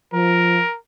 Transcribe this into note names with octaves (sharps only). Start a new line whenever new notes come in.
F3 A#4